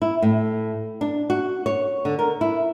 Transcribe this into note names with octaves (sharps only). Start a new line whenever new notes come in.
E4
A2
D4
F#4
C#5
D3
A#4
E4